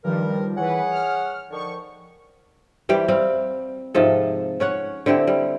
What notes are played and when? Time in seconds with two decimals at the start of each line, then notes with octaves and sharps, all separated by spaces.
0.04 G2 D#3 F3 G3 A#4
0.57 E3 G#4 B4 C#5 F#5
0.90 F6
1.51 D3 D#3 F3 C#6
2.89 E3 G3 G4 C5
3.08 G3 C4 F5
3.95 G#2 C3 F3 A4
4.60 C#4 C#5 F#5
5.06 D3 C4 E4 G4
5.27 G3